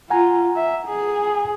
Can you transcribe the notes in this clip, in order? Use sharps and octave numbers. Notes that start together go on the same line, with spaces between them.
F4 F#5 G#5 A#5
E5
G#4